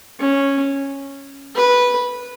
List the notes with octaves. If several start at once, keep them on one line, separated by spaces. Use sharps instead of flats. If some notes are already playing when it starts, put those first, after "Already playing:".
C#4
B4